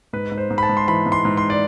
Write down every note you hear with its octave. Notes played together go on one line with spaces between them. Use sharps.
G#2 B4
G#2
C5
G#2
B5
A5
G#2
C6
E3 B5
G#2
C6
G#2
C6
D5